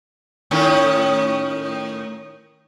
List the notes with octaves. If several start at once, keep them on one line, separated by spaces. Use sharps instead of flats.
A2 D#3 C#4